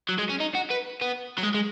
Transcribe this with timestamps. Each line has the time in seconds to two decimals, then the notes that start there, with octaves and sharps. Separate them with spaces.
0.09 F#3
0.18 G#3
0.29 C#4
0.40 D#4
0.55 F#4
0.70 B4
1.01 B3
1.38 F#3
1.43 G#3
1.54 G#3